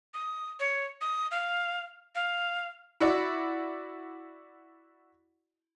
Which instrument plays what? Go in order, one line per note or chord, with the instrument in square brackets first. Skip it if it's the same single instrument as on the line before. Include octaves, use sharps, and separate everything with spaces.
[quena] D#6
C#5
D#6
F5
F5
[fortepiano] E4 F#4 D5